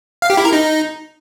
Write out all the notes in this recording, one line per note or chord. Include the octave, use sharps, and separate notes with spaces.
F5
G4
E4
A#4
D#4